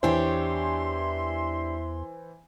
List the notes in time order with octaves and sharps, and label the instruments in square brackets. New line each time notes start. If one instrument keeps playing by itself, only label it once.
[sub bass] E2 [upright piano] E3 C5 [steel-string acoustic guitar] D4 G4 C#5 [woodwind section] E5 C6